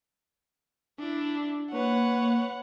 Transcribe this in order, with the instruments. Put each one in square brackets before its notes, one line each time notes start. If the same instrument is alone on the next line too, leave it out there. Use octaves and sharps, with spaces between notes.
[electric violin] D4 E4
[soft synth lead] A#3 [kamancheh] B4 C#5 [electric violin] F#5